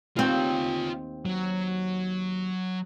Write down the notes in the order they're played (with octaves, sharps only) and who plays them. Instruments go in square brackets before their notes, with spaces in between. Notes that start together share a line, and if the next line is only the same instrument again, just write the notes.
[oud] D#2 C4 [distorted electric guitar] F4 C#5
[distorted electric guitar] F#3